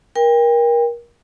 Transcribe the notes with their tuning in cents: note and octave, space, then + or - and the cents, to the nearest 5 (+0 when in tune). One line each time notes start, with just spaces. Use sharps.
A#4 +25 G5 +30